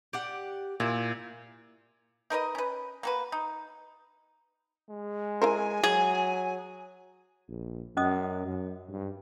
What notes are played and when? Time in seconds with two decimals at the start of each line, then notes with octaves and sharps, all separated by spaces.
0.13 G4 D5 F#5
0.80 A#2 E4
2.30 D#4 A#4 B4 D#5
2.55 C#4 B4
3.03 A#3 F#4 B4
3.32 D#4
4.90 G#3
5.42 E4 A#4 C5 G#5
5.84 F#3 G#4
7.48 A#1
7.97 F#2 C#4 D#5 D#6
8.46 F#2
8.90 G2